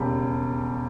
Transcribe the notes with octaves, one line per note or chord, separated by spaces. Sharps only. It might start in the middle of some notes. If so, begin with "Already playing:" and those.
Already playing: E1 D#2 C#3 G3